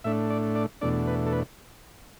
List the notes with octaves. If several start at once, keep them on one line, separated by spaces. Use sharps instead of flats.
A2 A3 D4 E5
D5
D5
E2 B2 A3 D4 D5
B4
A4
B4